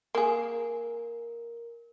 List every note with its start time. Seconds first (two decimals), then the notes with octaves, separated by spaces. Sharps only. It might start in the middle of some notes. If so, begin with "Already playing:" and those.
0.15 A#3 G#4 A#4